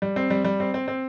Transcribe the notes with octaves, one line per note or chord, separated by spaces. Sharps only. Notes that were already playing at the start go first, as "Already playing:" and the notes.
G3
C4
G3
G3
C4
C4
C4